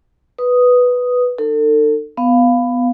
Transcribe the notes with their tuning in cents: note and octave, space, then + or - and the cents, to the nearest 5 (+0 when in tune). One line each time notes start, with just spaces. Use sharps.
B4 +0 D#6 +0
D#4 -40 A4 +35
B3 +10 F5 +0